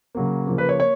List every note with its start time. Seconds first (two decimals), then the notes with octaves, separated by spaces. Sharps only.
0.15 C#3 F#3 A#3
0.47 C#3 F3 A#3
0.58 B4
0.69 C#5
0.80 A#3 C#5